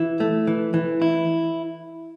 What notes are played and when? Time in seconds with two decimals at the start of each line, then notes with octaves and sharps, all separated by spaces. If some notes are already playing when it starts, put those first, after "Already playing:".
Already playing: E3 E4
0.20 A3
0.47 E3
0.74 E3
1.02 E4